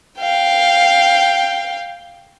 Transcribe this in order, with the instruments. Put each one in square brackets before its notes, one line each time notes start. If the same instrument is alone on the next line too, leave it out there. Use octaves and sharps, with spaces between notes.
[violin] F5 G5